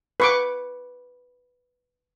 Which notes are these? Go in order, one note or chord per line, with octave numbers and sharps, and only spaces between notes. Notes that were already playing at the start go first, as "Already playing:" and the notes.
B4 C#6 D6